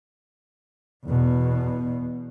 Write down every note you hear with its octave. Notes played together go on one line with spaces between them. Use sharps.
E2 B2